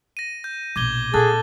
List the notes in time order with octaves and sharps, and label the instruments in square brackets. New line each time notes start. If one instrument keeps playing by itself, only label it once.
[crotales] A#6 D#7
G6
[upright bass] A#1 B2 [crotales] D6 G#6 G7
[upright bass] A#2 C4 [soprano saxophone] G#4 [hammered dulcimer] A4 [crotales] F#6 A6